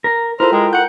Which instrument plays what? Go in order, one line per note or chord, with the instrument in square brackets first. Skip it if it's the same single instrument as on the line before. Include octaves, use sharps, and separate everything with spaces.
[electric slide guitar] A#4
[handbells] E4 F4 A4 [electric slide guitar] A#4 [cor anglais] C5
[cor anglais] G#3 [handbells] G5
[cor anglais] F#5 [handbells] G6 C#7